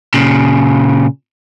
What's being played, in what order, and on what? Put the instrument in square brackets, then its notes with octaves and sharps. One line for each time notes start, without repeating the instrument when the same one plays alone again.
[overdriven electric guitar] A#2 C#3